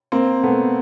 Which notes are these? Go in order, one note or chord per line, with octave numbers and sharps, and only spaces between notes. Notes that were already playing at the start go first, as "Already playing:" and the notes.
A#3 C4
A3 B3